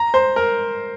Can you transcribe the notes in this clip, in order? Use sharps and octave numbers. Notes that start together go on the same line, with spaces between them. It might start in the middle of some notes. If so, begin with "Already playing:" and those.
Already playing: A#5
C5
A#4